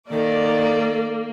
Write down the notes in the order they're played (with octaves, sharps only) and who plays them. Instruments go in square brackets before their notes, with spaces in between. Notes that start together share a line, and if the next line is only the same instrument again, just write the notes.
[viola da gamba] D#3 [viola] A#3 [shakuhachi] A4 [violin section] D5